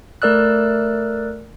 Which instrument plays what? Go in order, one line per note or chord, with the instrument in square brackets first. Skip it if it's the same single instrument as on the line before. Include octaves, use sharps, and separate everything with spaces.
[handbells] A3 A#4 D5 E6 F#6